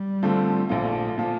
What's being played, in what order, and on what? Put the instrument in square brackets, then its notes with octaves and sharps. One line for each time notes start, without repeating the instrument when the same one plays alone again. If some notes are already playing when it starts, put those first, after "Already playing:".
Already playing: [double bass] G3
[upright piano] D3 F3 A3 C4
[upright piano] A#1 A#2 F3 [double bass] A3
[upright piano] A#2 F3